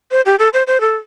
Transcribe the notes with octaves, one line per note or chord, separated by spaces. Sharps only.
C5
G4
A4
C5
C5
A4